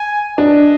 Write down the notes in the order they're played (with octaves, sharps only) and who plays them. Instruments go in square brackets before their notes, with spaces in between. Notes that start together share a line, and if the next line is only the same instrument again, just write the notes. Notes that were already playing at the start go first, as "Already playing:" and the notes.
Already playing: [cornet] G#5
[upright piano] D4 [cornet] D#5